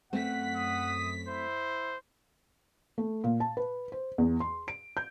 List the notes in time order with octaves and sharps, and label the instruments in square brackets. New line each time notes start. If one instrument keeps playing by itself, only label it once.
[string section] F#2 B6 [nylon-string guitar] A3 C4 [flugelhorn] F#5
[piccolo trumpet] D#6
[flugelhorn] E4 [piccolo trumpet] C5
[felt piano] A3
A#2
A5
B4
C5
E2
C6
D7
G6